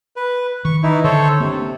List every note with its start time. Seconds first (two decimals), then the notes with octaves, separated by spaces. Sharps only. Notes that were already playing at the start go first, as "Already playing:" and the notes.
0.16 B4
0.65 D#3 C#6
0.83 E3 D#4 E4
1.04 D3 A4 C5 C#5
1.40 C3 A#3 B3 D4